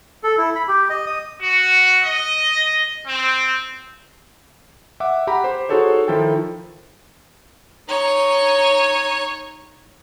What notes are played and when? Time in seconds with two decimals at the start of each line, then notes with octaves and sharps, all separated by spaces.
0.24 A4
0.38 E4
0.56 B5
0.68 G4
0.90 D#5
1.06 D#6
1.40 F#4
2.05 D#5
3.06 C4
5.00 E5 F#5 D6
5.27 G4 F#5 A#5 B5
5.44 G4 C5
5.69 D#4 F#4 G#4 A4 C5 C#5
6.08 D#3 F3 E4 A4 G5
7.88 D#4 C#5